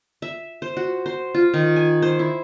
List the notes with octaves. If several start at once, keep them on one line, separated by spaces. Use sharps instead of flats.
E5
C5
F#4
C5
F4
D#3
G#5
C5
E4